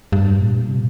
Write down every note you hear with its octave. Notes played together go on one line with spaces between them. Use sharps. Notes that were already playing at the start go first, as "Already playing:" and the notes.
G2
A#2
C3